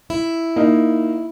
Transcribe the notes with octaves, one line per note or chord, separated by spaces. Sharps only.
E4
A#3 D#4